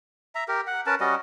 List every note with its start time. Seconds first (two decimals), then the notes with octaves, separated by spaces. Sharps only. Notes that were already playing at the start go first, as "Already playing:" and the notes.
0.35 E5 A#5
0.48 G4 A#4
0.67 F#5
0.86 C#4 A#4 B4 A5
1.00 G3 C#4 F#4 D#5